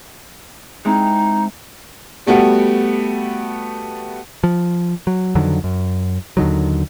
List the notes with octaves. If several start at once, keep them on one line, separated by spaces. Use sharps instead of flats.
G#3 C4 D#4 E4
G3 A3 B3 F#4 G4
F3
F#3
F2 D3 D#3 F#3
F#2
D#2 D3 D#3 F#3